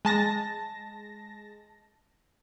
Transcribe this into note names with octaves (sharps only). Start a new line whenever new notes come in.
G#3 A5 A#6